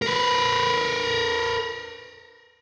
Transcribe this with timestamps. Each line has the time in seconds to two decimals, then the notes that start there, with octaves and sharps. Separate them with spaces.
0.02 A#4 B4